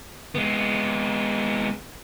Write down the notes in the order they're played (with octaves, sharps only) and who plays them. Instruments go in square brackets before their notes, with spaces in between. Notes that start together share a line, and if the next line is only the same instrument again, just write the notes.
[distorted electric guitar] G#3 B3